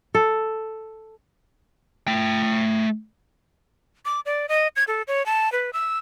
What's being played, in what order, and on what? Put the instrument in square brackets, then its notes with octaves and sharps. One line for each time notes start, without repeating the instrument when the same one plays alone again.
[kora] A4
[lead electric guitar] A3 G5
[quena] D6
D5
D#5
G#6
A4
C#5
A5
B4
E6